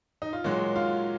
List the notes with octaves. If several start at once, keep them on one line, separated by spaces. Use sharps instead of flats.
D#4
F4
A#2 F#3 G#3 F#4
F4 F5